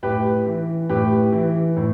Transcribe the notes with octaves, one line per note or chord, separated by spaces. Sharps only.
A2 G4 B4
E3
A2 G4 B4
E3
A2